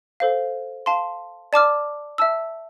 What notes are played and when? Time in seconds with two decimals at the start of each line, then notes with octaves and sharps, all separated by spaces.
0.20 A4 C5 F5
0.86 F5 A5 C6
1.53 D5 A5 D6 F6
2.18 E5 A5 E6